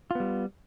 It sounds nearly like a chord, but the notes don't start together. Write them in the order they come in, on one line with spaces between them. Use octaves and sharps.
F4 B3 G3